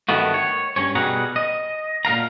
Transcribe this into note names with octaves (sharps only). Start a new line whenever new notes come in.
G2 D#3 A3 B3 F#4
C#5
G2 C#4 C#5
B2 G3 G#4 F#5 A#5
D#5
A#2 A#4 F5 A#5